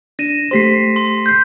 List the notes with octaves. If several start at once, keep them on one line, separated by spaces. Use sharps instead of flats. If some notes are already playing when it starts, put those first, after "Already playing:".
D4 A#6 D#7 E7
A3 G4 C5 C6 B6 C7
C6
G6 C7